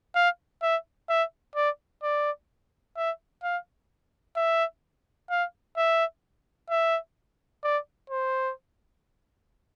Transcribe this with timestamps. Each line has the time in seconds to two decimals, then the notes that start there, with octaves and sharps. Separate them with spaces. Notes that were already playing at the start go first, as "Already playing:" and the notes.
0.15 F5
0.62 E5
1.09 E5
1.56 D5
2.03 D5
2.97 E5
3.43 F5
4.36 E5
5.30 F5
5.77 E5
6.70 E5
7.64 D5
8.10 C5